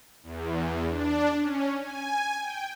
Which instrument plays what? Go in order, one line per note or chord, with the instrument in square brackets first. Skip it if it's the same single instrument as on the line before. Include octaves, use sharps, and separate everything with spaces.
[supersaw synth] E2
D4
C#4
G#5
G5